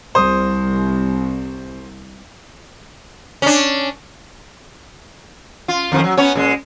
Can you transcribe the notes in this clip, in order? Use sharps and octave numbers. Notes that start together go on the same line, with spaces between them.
C2 C5 D#6
C#4 D4
F4
F2 D#3 F3
F#3
B3 C#4 C#5
A#2 G#3